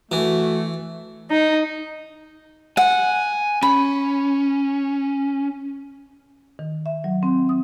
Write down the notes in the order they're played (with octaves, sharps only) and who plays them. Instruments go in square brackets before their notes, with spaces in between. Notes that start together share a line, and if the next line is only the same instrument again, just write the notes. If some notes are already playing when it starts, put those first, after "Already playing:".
[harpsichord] E3 [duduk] A3 [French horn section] F#4
[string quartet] D#4
[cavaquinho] F#5 [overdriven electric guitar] G#5
[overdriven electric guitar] C#4 [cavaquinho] B5
[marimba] D#3
E5
F#3
C4
D#6